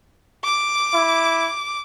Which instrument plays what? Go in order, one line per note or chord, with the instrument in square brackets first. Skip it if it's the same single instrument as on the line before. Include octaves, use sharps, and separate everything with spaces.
[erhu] D6
[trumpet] E4